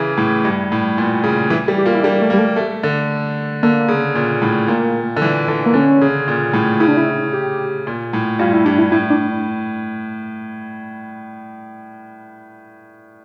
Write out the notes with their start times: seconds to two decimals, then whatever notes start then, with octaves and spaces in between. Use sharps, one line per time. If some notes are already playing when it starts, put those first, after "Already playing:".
Already playing: C#3 E3
0.17 A2
0.45 G2
0.72 A2
0.98 A#2
1.23 C#3
1.50 E3
1.68 G3
1.78 G4
1.86 A#3 F4
1.95 E4
2.03 G3 D4
2.21 A3
2.30 A#3
2.34 G3
2.38 A3
2.56 A3
2.83 D3
3.63 D3 A#3
3.88 C#3
4.15 A#2
4.42 A2
4.68 A#2 A#3
5.17 D3
5.22 E3
5.48 D3
5.66 A#3
5.74 D3 C#4
6.01 C#3
6.28 A#2
6.53 A2
6.80 C#3 E4
6.88 D4
6.97 E4
7.33 G4
7.87 A#2
8.13 A2
8.39 G2 F4
8.53 E4
8.65 G2 D4
8.78 E4
8.92 A2 E4
9.10 D4